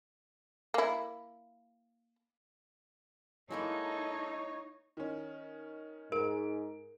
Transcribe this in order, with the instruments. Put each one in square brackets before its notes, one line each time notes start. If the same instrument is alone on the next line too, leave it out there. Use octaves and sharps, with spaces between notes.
[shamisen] A#3 E4
[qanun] G#3 A#3 E4 [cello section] D#4 [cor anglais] A4 [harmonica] C#5
[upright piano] D#3 C#4
[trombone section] G#2 [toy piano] A#4 [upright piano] D7